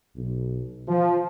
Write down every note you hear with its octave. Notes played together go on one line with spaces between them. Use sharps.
B1
F3